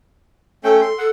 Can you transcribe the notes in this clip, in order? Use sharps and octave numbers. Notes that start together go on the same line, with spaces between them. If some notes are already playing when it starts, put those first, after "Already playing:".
A3 C#4 A4 G5
C6
A4 F#5